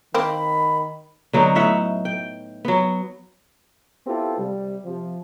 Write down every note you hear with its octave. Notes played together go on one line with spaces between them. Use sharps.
D#3 A#3 C4 B5
D3 F#3 B3 D#4
A2 D#4 E5 F#5
G5
F#3 B3
B3 C4 E4 F4 G4 A4
C3 G3
C3 F3